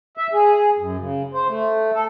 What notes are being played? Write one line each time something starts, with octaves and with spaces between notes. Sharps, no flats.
E5
G#4
F#2
C#3
C5
A3
A4